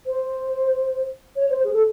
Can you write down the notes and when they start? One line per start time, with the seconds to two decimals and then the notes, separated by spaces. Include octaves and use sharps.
0.06 C5
1.36 C#5
1.50 C5
1.64 G#4
1.73 A4